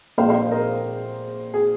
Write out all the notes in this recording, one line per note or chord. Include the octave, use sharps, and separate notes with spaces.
A#1 A#2 G#3 C5 F5
C5 F5
A#4 D#5
G#4